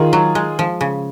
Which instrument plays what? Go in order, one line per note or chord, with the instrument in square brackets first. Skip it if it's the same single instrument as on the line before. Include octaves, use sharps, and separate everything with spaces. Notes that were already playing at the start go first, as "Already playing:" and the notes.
Already playing: [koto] D#3 [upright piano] F4 G#4
[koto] F#3
G#3
F3
C#3